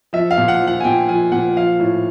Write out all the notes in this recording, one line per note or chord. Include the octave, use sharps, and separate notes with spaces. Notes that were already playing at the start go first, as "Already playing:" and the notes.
F3 E5
F5
A#2
F#5
F3
F#5
G#5
A#2 G5
F3 G#5
A#2 F#5
F3 F5
A2